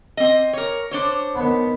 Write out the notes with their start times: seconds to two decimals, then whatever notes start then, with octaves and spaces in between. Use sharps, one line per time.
0.17 C4 D#5
0.53 A#4 C#5
0.91 D4 C5 C#5
1.35 D#3 B3